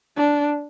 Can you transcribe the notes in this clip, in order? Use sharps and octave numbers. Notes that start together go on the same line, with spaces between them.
D4